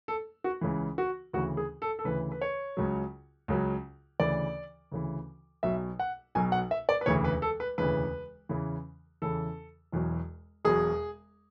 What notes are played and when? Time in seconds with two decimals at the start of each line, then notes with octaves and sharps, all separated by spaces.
0.08 A4
0.44 F#4
0.61 C#2 C#3 E3
0.98 F#4
1.33 D2 C#3 E3 F#4
1.57 G#4
1.82 A4
1.99 A4
2.05 D2 C#3 E3 B4
2.32 B4
2.42 C#5
2.77 C#2 C#3 F#3
3.48 C#2 C#3 F#3
4.20 D2 C#3 E3 D5
4.92 D2 C#3 E3
5.63 B1 B2 F#3 E5
5.99 F#5
6.35 B1 B2 F#3 G#5
6.52 F#5
6.71 E5
6.89 D5
7.01 B4
7.06 E1 D2 C#3 E3 C#5
7.24 B4
7.42 A4
7.60 B4
7.78 E1 D2 C#3 E3 B4
8.49 E2 C#3 E3
9.22 E2 C#3 E3 A4
9.93 E1 E2 B2 F#3
10.65 E1 E2 B2 F#3 G#4